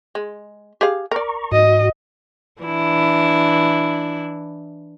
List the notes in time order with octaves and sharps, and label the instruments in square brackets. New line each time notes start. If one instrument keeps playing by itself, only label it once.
[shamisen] G#3
G4 G#4 F5
[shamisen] A#4 D5 [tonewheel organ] A#5 C#6
[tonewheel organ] G#2 F#4 [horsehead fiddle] D#5
[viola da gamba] E3 D4 E4